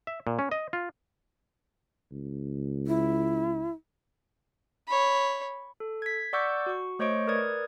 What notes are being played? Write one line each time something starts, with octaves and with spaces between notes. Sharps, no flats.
E5
A#2
C#4
D#5
F4
C#2
E4
C#5 B5
A4
G#6 B6
D5 F#5 C#6 D6 E6 G6
F#4 C#6
A3 C5 C#5 D#5 C#6 D7
A#4 B4 D5 D#6 G#6